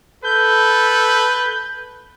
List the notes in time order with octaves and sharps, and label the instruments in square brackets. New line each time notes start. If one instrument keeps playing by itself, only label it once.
[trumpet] A4 [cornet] B4 [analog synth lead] G6